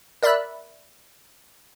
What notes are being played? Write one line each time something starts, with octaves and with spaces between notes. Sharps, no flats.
A#4 D5 E5 B5 E6 F#6